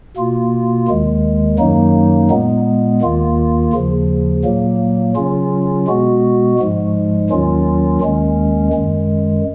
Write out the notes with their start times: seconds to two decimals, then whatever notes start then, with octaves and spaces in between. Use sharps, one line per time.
0.16 B2 A#3 F4
0.88 D#2 D#3 G#3
1.59 F#2 D#3 F#3 A#3 D#4
2.30 A#2 G#3 B3
3.02 D#2 D#3 A#3 F4
3.73 D#2 C#3 F3
4.44 A#2 F#3 A#3
5.16 C#3 F#3 C#4 F4
5.87 B2 G#3 B3 F#4
6.59 G#2 F3 G#3
7.29 D#2 D#3 F#3 C#4 F4
8.01 D#2 D#3 G#3 C#4
8.73 F#2 D#3 G#3